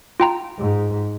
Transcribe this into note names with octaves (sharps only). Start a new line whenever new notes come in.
F4 G5 A#5
G#2